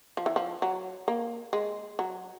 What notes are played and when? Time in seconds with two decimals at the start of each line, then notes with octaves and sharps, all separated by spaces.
0.17 F3
0.26 E3
0.36 F3
0.62 F#3
1.08 A#3
1.53 G#3
1.99 F#3